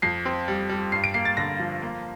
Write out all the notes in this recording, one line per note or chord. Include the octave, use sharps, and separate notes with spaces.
F2 C7
C4
G3
G3
G2 C7
D7
A#3 C7
A6
D3 A#6
F3
A#3